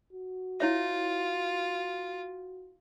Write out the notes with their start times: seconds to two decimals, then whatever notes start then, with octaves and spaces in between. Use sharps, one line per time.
0.13 F#4
0.60 E4 F4 C#5 E5